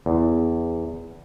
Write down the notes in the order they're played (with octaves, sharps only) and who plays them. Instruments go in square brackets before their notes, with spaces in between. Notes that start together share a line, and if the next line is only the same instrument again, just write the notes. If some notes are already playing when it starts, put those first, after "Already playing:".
[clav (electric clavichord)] E2